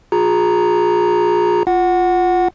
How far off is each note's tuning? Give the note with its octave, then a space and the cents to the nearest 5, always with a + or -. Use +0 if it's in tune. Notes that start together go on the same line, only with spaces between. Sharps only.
F4 +40 G#4 +0 A#5 +0
F4 +0 F#5 +0